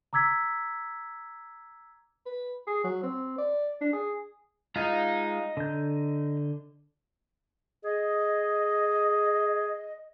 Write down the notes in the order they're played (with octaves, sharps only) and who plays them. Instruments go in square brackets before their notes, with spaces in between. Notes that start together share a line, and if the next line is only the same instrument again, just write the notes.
[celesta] A#5 D6 E6 G#6 B6
[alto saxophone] B4
G#4
F#3
C4
D5
D4
G#4
[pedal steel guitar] G#3 F4 F5 [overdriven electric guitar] D#5 A#5
[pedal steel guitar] D3 G6
[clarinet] G#4 [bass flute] D#5